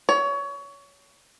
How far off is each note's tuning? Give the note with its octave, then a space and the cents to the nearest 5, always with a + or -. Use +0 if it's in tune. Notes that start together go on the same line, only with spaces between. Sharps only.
C#5 +25